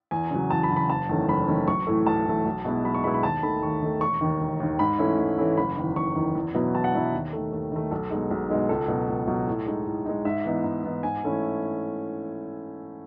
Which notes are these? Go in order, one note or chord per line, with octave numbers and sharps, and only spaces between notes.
E2 G#5
C#3 F#3
E2 A5
B5
C#3 F#3
B5
F#1 A5
E2 D#3 A3 C#4
F#1 B5
E2 D#3 A3 C#4
B1 C#6
A2 E3 A3
B1 A5
A2 E3 A3
B1
B2 G#3 B3 E4
B1 B5
C#6
B2 G#3 B3 E4 B5
B5
D#2 A5
D#3 A3 B5
D#2 C#6
D#3 A3
E1 C#6
D#2 D#3
E1
D#2 D#3
G#2 B5
E3 A3 C#4 E4
G#2
E3 A3 C#4 E4
F#1 B5
E2 D#3
F#1 C#6
E2 D#3
E2
B2 F#3 B3 E4
E2 A5
F#5
B2 F#3 B3 E4 E5
D#2
D#3 A3
D#2
D#3 A3
B1 A4
B2 G#3 D#4
B1
B2 G#3 D#4
C#2 A4
B2 F#3
C#2
B2 F#3
A2
G#3 D#4
A2
G#3 D#4
G#2 E5
E3 B3 D#4
G#2
E3 B3 D#4
G#2 G#5
E3 A3 C#4 E4